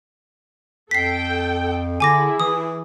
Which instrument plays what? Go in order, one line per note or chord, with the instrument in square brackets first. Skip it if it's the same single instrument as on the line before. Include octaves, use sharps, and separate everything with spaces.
[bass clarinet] F2 [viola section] A4 G5 [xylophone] B6 C7
[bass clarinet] D3 [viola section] E4 G#4 [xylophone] G#5 D6 A#6
[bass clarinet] E3 [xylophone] D#6